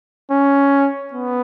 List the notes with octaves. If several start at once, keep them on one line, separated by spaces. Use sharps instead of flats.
C#4
B3